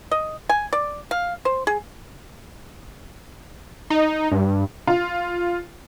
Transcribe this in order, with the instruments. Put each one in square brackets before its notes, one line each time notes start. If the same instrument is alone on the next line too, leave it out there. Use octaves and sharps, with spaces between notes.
[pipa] D#5
G#5
D5
F5
C5
G#4
[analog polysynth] D#4
G2
[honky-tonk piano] F4